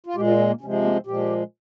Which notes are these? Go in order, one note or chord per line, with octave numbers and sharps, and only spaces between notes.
F4
A#2 G#3 G4
F4
C#4
A#3
C3 F3 G#3 C#4
C4
A#3
C4
A#2 F3 G#3 G4